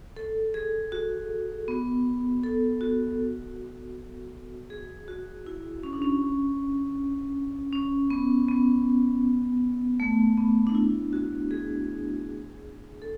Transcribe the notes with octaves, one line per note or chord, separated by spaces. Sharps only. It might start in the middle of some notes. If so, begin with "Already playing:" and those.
A4
G#4
F#4
B3
A4
F#4
G#4
F#4
E4
C#4
D4
C#4
C#4
B3
B3
A3
B3
D4
E4
F#4
G#4
A4